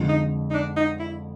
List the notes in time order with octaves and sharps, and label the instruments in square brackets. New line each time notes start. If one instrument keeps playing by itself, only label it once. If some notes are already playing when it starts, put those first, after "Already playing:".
Already playing: [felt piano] F2 D3 F3 G#3
[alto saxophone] D#4
D#4
D4
D#4
E4